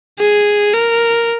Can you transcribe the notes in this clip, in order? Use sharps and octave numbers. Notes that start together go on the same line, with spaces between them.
G#4
A#4